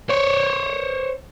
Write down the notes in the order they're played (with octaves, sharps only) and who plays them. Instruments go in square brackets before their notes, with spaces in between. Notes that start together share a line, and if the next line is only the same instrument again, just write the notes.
[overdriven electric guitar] C5 C#5